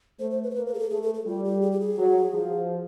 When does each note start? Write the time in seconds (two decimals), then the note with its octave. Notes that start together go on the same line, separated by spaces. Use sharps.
0.19 A3 C5
0.31 C5
0.43 B4
0.51 C5
0.54 A#3 B4
0.66 B4
0.74 G#4
0.79 A4
0.90 A3 G#4
1.02 A4
1.14 A4
1.25 G3 F4
1.44 G4
1.62 G#4
1.72 G4
1.80 G#4
1.98 F#3
2.33 F3